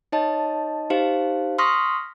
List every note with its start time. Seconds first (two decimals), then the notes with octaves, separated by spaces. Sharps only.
0.12 D#4 C#5 D#5 A5
0.90 D#4 G4 C5 F5
1.59 C6 C#6 D#6 F6 A#6 B6